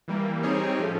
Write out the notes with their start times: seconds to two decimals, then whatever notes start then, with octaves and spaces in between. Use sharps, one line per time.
0.08 E3 G3 A#3
0.43 G3 C4 D#4 G#4 C#5
0.79 A2 F3 A3 C#4